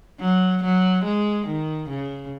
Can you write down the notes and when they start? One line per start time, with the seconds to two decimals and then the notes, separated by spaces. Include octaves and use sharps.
0.20 F#3
0.63 F#3
1.04 G#3
1.46 D#3
1.89 C#3